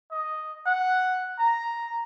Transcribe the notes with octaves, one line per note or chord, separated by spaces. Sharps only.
D#5
F#5
A#5